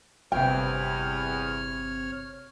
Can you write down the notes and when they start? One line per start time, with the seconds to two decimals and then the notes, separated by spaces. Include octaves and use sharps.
0.32 G1 E2 C3 C#5 G5 F6